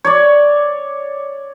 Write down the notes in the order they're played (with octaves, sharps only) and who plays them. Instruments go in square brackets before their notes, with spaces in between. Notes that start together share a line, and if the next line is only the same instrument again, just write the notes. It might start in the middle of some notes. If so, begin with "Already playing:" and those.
[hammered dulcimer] C#5 D5